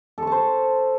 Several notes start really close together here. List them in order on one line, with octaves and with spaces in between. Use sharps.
A4 C#6 A5 C5